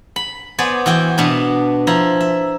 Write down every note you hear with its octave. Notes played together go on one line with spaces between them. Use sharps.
B5
B3 C5 D5 G#5
E3 F#4 G5
B2 B3 D4
F3 E4 A#5
E5